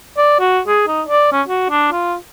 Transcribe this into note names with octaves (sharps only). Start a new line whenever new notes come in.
D5
F#4
G#4
D#4
D5
C#4
F#4
D4
F4